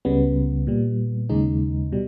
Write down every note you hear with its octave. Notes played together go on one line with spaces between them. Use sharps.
C#2 C#3 G3 B3
A#2 G3
D#2 C#3 G#3 D#4
B2 G3